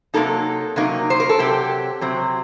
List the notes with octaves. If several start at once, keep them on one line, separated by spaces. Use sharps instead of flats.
C3 F#3 A#3 D#4 A4
C3 F#3 A#3 D#4
C5
A#4
A4
C3 F#3 C4 G4
C3 F#3 C4